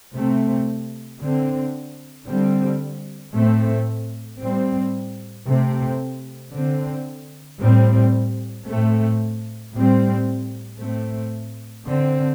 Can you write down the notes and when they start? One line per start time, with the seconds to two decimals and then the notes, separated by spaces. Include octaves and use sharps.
0.14 C3 A3 C4
1.20 D3 C4
2.27 D3 G3 C4
3.34 A2 A3 C4
4.41 A2 G3 C4
5.47 C3 A3 C4
6.53 D3 C4
7.59 A2 G3 C4
8.67 A2 A3 C4
9.73 A2 G3 C4
10.79 A2 A3 C4
11.85 D3 C4